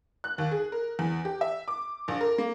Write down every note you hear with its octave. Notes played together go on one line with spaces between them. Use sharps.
F#6
D#2
G#4
A#4
E2
G4
E5
D6
A#1
A#4
A#3